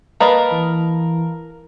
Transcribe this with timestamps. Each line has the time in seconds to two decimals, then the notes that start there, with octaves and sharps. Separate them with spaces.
0.20 A#3 A#4 B4 D#5 A5
0.52 E3